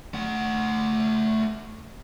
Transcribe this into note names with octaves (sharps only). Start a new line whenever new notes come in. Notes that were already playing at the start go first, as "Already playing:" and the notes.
A3 F#5